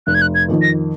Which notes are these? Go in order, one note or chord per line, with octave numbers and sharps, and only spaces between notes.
F1 F#6
G#6
F#6
G#6
F2 D#3
A#6